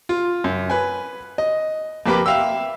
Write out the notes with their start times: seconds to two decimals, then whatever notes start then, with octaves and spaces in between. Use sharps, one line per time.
0.09 F4
0.44 F#2
0.70 B4 G#5
1.38 D#5
2.06 F2 A#3 G4 B4 B5 D6
2.26 E5 F5 G5 E6